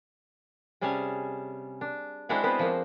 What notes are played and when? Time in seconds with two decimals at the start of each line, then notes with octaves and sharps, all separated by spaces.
0.81 C3 G3 C#4 G#4 G#5 A5
1.81 D4
2.29 G#3 C4 D4 E4 F#4 G#4
2.43 B3 C4 E4 B4 C5
2.59 F3 A#3